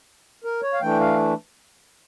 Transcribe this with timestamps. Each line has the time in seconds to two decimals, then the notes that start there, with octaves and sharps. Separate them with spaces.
0.44 A#4
0.62 C#5
0.73 F5
0.81 E3 A3 D4 G5
1.00 F5